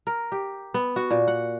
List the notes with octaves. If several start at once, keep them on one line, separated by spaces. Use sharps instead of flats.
A#4
G4
B3
F#4
A#2
F#5